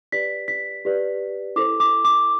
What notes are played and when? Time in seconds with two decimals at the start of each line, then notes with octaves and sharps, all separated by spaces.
0.12 G4 B4 D5 B6
0.48 B6
0.85 G4 B4 D5
1.56 E4 A4 C5 D6
1.80 D6
2.05 D6